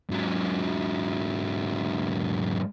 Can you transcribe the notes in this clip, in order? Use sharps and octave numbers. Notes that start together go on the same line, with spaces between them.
G#2 F#3